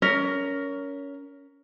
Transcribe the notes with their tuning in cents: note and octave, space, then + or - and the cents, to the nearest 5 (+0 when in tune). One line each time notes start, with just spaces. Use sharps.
C#4 +20 A#4 +0